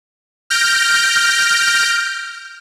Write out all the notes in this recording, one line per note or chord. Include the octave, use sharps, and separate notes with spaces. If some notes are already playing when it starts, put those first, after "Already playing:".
F6 G6 A#6 D7